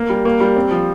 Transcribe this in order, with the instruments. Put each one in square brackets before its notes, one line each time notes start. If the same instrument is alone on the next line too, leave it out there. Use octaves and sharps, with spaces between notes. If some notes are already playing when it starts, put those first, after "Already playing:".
Already playing: [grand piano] A#3
G3
A#3
G3
C4
F3